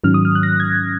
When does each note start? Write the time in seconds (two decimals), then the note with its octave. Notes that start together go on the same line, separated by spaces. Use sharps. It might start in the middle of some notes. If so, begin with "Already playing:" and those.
0.04 G#2 D#3 F#3 C#4 F6
0.14 D#6
0.25 F6
0.35 F#6
0.43 A#6
0.60 G#6